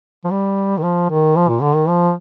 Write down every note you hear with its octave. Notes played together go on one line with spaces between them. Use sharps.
F3
G3
D#3
F3
D#3
F3
A#2
D3
D#3
F3